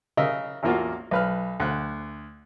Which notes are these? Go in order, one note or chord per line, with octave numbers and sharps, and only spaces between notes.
C#3 A#4 D#5 E5
A1 E2 A#3 F4 F#4
B1 B4 F6
D2 F#6